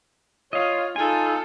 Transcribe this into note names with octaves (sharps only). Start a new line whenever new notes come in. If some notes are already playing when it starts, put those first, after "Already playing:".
F4 C#5 D#5 F5
D#4 F4 A4 G#5